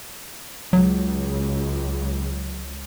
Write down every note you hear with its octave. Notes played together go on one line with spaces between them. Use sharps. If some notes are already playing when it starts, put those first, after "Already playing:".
C#2 F#3